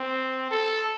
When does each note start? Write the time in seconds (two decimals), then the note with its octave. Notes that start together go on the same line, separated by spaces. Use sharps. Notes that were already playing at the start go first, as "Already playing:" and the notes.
Already playing: C4
0.51 A4